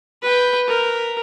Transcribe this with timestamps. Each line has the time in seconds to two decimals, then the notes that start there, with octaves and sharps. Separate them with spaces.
0.23 B4 G5
0.68 A#4